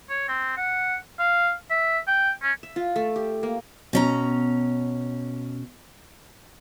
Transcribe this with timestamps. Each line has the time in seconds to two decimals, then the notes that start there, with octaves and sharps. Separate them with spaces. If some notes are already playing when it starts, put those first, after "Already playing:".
0.10 C#5
0.28 C4
0.57 F#5
1.19 F5
1.70 E5
2.07 G5
2.43 C#4
2.63 E5
2.76 F4
2.96 A3
3.16 G4
3.43 A#3
3.93 B2 C#4 A#5